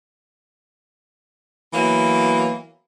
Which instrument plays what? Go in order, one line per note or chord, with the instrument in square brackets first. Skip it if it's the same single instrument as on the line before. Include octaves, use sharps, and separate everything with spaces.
[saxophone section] E3 F#3 A#3 B3